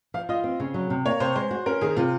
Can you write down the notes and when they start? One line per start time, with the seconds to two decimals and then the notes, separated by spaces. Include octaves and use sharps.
0.14 F3 F5
0.29 F4 D#5
0.44 C4
0.60 C#3
0.74 F#3
0.90 C3
1.05 A#3 C#5
1.20 C3 C5
1.35 G#3 C5
1.51 F#4
1.66 C#4 A#4
1.81 D#3 G#4
1.96 C3 F4